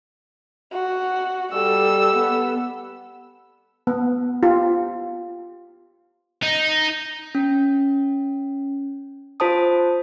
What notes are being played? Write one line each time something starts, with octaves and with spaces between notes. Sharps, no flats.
F#4
G3 A4 E6
B3
B3
F4 G4
D#4
C#4
F4 C5 A5 D#6